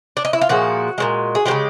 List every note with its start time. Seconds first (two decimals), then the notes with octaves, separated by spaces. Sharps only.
0.17 D4
0.25 D#4
0.33 E4
0.41 F4
0.49 A#2 F3 G#3 F#4
0.98 A#2 F3 G#3
1.35 G#4
1.46 F3 G#3 G4
1.51 C#3